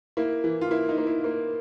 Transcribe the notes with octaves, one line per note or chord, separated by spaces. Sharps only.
A#3 E4
E3
F4
A#3 E4
D#4
A#3
E4
A#3